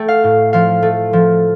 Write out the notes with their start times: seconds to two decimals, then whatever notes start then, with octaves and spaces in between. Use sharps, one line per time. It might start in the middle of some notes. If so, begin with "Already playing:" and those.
Already playing: A3 G5
0.08 F5
0.24 A2
0.53 F3 F5
0.82 A3
1.13 F3